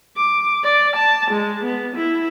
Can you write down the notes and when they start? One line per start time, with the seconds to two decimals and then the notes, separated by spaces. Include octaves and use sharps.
0.17 D6
0.63 D5
0.96 A5
1.31 G#3
1.64 B3
1.96 E4